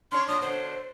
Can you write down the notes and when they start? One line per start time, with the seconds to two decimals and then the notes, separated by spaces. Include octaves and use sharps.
0.12 C#4 D4 C#5 C6
0.28 A#2 D4 D#6
0.41 B2 D3 C5